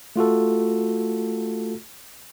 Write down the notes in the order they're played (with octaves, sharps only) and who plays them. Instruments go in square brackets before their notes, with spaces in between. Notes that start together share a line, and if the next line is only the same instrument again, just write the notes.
[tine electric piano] A3 F4 F#4 A4